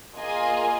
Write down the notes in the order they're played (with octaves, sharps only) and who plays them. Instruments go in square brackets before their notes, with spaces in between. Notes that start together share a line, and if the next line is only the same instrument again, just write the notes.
[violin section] A#3 F4 G#4 D#5 G#5